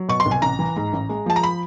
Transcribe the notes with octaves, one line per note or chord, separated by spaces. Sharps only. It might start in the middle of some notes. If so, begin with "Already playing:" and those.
Already playing: F#3
B2 C#6
C6
C2
G#5
A1 A#5
E3
G#2
A1
G#3
F3 A5
A#5
B5